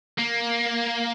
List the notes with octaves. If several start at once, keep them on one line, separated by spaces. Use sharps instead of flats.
A#3